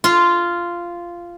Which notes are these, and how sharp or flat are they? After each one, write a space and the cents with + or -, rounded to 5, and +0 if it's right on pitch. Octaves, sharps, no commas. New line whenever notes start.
F4 -10